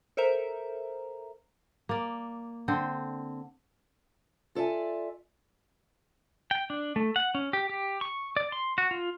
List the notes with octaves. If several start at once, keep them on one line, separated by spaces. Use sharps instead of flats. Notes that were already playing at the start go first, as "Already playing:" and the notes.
A4 A#4 C5 E5 A#5
A#3 D5
D3 C4
F4 A4 D5 E5 G#5
G5
D4
A3
F#5
C#4
G4
G4
C#6
D5
C6
F#4
F4